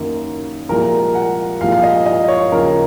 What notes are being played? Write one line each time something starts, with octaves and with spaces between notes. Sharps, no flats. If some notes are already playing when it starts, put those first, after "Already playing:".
Already playing: F#2 D#3 F#3 A#3
C2 A#2 F3 G#3 A#4
F#5
C2 A#2 F3 G#3 F5
F5
D#5
D#5
C#5
D#2 C#3 F3 A#3 A#4